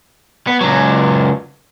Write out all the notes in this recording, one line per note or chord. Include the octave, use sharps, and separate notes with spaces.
B3
C#2 F#3